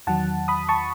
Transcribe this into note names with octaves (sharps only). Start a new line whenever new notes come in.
E2 D#3 F#3 F#5 A5
B5 D#6
A5 C#6